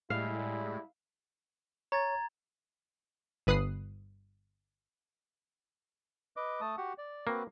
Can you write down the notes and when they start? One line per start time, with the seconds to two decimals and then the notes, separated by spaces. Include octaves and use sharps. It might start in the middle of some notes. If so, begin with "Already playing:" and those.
0.10 A2 G3 G#3 E4 F5
1.92 C#5 A#5 G#6 A6
3.47 G1 B4 D#6 F#6 C7
6.36 B4 D#5 D6
6.61 A3 A5 D#6
6.77 F#4 G4 F#5
6.98 D5
7.27 A#3 C4 F#4 B4